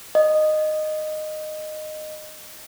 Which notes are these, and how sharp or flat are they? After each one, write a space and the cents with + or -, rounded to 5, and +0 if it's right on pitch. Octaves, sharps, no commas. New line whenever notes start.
D#5 -15